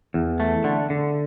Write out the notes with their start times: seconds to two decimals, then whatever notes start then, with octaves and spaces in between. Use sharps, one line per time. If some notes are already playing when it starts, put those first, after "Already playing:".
0.14 E2
0.40 A3
0.64 D3
0.90 D3